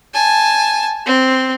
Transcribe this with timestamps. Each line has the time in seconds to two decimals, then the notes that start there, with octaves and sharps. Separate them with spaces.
0.14 G#5 A5
1.06 C4